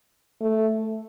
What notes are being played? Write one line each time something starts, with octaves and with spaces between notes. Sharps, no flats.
A3